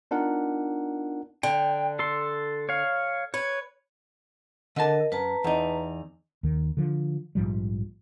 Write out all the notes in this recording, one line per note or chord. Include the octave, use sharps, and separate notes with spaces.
B3 D4 D#4 F4 A#4 F#5
D3 G5
A4 C6
C#5 F5
B4 C#5
D3 A#4 D#5 A5
F#2 B4 A5 A#5
E2 D#4
D#2 D#3
D3 F3
A#1 G#2 F3 G3